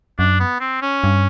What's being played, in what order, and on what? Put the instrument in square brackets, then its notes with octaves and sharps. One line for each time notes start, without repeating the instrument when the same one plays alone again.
[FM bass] F#2 [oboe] D4
[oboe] B3
C4
C#4
[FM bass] G2